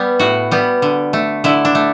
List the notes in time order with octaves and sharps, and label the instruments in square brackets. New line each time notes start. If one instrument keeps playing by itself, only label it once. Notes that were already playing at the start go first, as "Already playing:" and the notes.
Already playing: [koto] G3 B3
A2 F#4
G3 B3
D3
A3
D3 E4
D4
A3